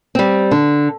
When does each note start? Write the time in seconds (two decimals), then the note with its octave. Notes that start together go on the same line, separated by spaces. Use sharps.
0.15 G3 C4
0.51 D3